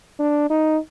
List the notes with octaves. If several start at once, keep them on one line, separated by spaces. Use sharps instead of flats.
D4
D#4